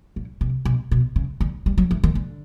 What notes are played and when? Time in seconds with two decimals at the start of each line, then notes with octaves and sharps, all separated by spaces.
0.16 A#2
0.41 C3
0.65 B2
0.91 B2
1.16 C#3
1.41 D3
1.66 G3
1.78 F#3
1.91 E3
2.04 D#3
2.15 D3